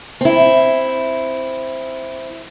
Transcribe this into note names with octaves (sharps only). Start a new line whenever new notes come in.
C4 E4